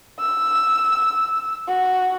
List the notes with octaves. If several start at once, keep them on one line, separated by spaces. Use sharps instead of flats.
E6
F#4